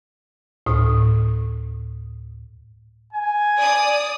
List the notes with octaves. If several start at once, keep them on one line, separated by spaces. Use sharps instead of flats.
D2 A2 D#6
G#5
D5 D#6